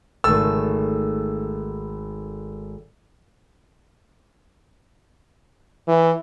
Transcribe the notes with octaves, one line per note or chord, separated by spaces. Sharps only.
G#1 A3 A4 E6
E3